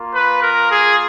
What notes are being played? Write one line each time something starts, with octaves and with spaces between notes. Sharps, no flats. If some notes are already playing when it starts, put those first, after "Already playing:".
Already playing: A#3 F4
B4
A#4
G#4